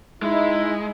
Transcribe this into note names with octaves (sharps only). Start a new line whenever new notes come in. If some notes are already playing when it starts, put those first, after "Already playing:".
G#3 D#4 E4